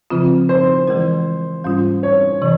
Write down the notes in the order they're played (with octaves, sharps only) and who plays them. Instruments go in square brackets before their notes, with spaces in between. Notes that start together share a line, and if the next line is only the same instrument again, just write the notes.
[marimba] C#3 F3 C4 F4
[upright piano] C5
[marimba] E3 G#3 E4 A#4
G#2 G3 C#4 F4
[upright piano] C#5
[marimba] C3 E3